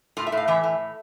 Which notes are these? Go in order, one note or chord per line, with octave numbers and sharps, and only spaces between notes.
A2 F4
E5
A2
F5
E3 E5
A2